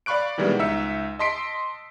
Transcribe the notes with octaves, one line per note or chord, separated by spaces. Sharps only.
D5 F5 B5 C#6 F#6 D7
B2 D#3 E3 G3 G#3 B3
C#2 D#4 E5 E6 C#7
D#5 A5 C6 B6 C7 D7